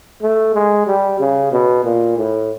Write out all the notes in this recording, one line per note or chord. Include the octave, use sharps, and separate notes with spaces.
A3
G#3
G3
C#3
B2
A#2
A2